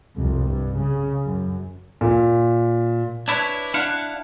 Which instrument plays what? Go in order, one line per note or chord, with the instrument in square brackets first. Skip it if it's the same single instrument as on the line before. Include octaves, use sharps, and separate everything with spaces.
[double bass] C2 F2
G2
C#3
F#2
[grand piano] A#2
[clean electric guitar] D4 E4 B4 C#5
D4 E4 F5 F#5